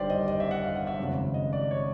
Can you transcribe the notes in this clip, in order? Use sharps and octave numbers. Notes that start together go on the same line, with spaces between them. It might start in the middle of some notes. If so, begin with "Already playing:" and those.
Already playing: G1 G2 D#3 G4 C5 D5
D#5
D#5
E5
F#5
F5
F#5
E5
G#1 F#2 C#3
D#5
D5
C#5